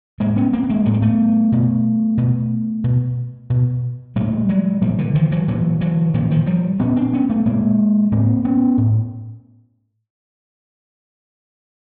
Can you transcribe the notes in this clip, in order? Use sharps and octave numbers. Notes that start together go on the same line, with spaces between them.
A2 G#3 A#3
B3 C#4
A#3 C4
B3
G#3 A#3
A2 B3
C4
A3 B3
B2
B2
B2
B2
A#2 G3 A3
F#3 G#3
A#2 F3 G3
D3 E3
D#3 F3
E3 F#3
A#2 E3 F#3
E3 F#3
A#2 D#3 F3
D#3 F3
F3 G3
A#2 B3 C#4
C4 D4
B3 C#4
A3 B3
A#2 G#3 A#3
A2 A#3 C4
B3 C#4
A2